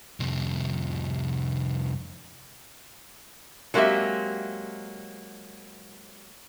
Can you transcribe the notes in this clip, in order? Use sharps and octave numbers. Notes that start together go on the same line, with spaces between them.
C2 F2
F#3 G#3 A#3 C4 G4 E5